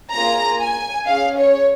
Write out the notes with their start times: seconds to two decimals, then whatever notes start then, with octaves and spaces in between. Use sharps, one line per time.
0.13 A#3 F4 G#4 A#5
0.60 G#5
1.06 C#4 G#4 F5
1.38 C#5